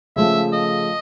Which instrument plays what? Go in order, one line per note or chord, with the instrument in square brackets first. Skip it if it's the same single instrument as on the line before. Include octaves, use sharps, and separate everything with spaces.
[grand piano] C#3 F3 A3 [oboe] E5
[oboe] D#5